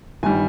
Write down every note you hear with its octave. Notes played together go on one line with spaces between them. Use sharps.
G1 D#3 G3 G#5